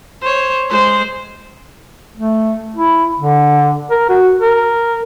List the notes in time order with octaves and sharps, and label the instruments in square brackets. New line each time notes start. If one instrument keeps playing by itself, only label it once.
[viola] C5 C#5
G#3 C5
[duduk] A3
E4
D3
A#4
F#4
A#4